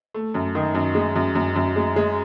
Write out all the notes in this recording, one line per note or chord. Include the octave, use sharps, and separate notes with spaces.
A3
F#2
D#3
F#2
G#3
F#2
F#2
F#2
G#3
G#3